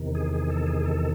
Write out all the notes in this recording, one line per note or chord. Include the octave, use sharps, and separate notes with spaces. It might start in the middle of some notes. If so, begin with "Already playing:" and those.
Already playing: E2 C3 D#3
G#4
G#4
A4
G#4
A4